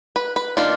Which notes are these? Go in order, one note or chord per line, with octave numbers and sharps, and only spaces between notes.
B4
B4
D#3 A#3 D4 F4